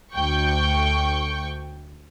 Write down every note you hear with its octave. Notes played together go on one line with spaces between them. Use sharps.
D2 G5 C#6